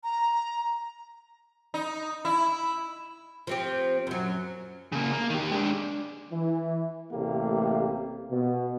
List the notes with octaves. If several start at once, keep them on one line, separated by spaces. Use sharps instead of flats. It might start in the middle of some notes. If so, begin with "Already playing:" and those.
A#5
D#4
E4
F3 C4 G4
F#2 F#3
C#3 A#3
A#3
D#3 G4
G#3 D4
E3
A1 C3 A3 A#3 G4
B2